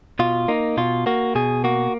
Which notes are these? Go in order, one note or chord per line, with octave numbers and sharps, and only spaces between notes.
B2 F4
A#3 D#4
B2 F4
A#3 F#4
B2 G#4
A#3 F#4